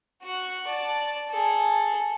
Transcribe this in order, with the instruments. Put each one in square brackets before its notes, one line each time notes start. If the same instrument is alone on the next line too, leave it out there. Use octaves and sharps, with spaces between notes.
[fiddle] F#4 F#5
D5 A5
G#4 A4